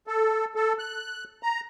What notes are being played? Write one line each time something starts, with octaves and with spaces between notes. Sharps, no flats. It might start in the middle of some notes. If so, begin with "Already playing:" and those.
A4
A4
F#6
A#5